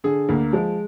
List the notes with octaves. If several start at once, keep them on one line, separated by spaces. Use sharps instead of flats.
D3 G#4
D2 A#3
F3 G#3